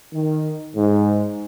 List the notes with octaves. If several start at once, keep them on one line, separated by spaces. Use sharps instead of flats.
D#3
G#2